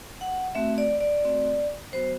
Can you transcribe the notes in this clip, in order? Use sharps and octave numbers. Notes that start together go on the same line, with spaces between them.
F#5
A3 C4 F#4 E5
D5
D5
A3 C4 F#4
F#3 B3 F#4 C5